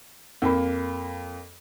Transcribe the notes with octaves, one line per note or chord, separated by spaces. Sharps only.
F2 A#3 B5